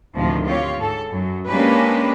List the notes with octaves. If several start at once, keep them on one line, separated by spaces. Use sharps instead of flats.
D2 A2 C3 D#3 F3
C4 F4 G4 C#5 F5
G#2 A4
F#2 F#3
G#3 A#3 C#4 D4 G4 B4